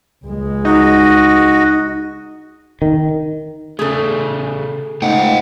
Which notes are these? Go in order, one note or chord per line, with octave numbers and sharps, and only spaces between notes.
C#2 G#3
D#4 F#4 D#5
D#3
C#3 A3 G#4 A4
C#2 A3 D#4 C5 D#5 F#5 G5